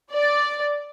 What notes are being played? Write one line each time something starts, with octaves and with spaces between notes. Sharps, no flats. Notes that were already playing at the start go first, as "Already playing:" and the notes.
D5